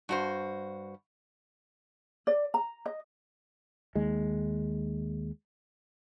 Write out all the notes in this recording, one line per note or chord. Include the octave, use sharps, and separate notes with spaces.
G2 F#4 C5
D5
A#5
D#5
D#2 G#3